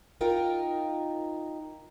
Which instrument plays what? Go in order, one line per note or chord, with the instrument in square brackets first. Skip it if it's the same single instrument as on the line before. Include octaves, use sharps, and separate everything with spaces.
[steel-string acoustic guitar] D#4 F4 A#4 G5